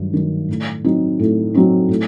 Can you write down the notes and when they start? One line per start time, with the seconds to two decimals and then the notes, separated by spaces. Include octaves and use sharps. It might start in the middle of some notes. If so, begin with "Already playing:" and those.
Already playing: G2 D#3 F#3
0.14 D#3 F#3
0.49 A2
0.84 F#3 C4 D#4
1.19 A2
1.54 F#3 C4 D#4
1.89 A2